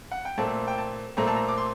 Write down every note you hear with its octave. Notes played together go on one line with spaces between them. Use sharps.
F#5
G5
A#2 A3 C4 A5
G5
A5
A#2 A3 C4 A#5
A5
A#5
D6
C6